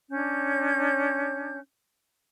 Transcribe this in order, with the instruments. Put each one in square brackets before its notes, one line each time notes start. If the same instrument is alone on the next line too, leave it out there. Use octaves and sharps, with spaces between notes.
[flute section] C#4 D4 C#5 G6